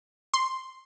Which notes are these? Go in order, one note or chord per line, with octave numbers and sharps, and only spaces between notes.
C6